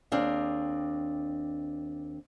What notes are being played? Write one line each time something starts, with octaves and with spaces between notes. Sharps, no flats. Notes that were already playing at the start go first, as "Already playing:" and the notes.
D#2 C4 D4 G#4 F5